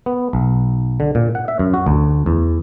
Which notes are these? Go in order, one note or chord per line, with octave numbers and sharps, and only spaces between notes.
B3
B1
D3
A#2
F#5
E5
F#2
F#4
D2
E2